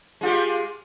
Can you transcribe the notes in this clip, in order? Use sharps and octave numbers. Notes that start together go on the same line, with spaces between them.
G#3 F4 G4